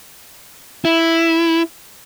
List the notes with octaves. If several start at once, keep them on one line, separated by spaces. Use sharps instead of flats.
E4